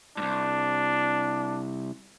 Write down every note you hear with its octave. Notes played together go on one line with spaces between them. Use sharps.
C2 G#2 D4